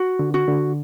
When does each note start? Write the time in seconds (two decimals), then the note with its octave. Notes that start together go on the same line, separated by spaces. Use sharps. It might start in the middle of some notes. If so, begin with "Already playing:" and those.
Already playing: F#4
0.19 D3
0.34 F#4
0.48 D3